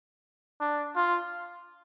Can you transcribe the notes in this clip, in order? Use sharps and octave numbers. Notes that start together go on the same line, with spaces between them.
D4
F4